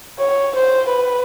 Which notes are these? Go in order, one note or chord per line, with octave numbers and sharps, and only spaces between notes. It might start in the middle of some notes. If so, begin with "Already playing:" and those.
C#5
C5
B4